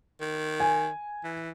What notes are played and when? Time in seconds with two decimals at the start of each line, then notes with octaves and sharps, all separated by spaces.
0.21 D#3
0.60 G#5
1.24 E3